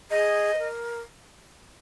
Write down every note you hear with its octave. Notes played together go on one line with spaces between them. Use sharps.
G#4 D#5
C5
A#4